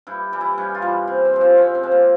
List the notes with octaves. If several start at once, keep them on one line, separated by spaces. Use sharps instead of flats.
G2 E4
E3 G3
E4
G2 C#4
F4
E3 G3
C3
C4
F3 G#3
C4
C3 C#4
C4
F3 G#3
A#3